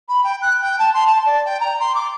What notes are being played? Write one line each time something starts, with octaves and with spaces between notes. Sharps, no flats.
B5
G5
F#6
G5
A5
C6
A5
D5
G5
A#5
C6
D6